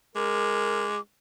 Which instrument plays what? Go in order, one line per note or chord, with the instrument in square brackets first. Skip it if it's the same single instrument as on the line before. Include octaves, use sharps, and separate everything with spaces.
[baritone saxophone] G#3 [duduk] A#4 [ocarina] D6